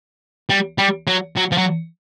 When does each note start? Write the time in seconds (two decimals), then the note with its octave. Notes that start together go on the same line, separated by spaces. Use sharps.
0.50 G3
0.78 G3
1.07 F#3
1.37 F#3
1.52 F3
1.58 F#3